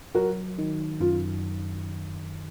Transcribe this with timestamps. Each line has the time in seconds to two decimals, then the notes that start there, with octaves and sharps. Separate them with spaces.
0.15 F#3 F#4 A#4
0.58 D#3
1.00 F#2 F4